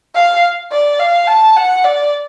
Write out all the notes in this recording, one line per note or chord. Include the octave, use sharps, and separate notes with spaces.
F5
D5
F5
A5
F#5
D5